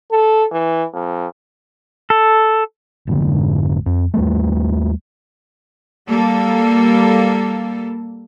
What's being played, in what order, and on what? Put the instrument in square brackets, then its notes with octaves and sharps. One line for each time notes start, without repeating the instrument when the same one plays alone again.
[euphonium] A4
E3
F2
[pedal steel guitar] A4
[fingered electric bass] F1 G#2 D3
F2
D#2 G3 A3
[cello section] G3 A#3 A4